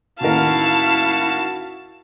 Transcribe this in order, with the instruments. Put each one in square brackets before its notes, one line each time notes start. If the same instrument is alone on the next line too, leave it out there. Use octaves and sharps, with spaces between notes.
[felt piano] A1 D#2 A#4 [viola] E4 F5 [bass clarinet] F#4 [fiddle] A5